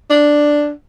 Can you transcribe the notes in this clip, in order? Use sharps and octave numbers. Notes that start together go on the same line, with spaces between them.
D4